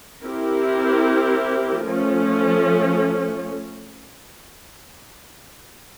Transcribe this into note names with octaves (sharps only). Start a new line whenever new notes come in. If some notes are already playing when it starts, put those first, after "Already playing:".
C4 E4 G4 A#4
F3 A3 C#4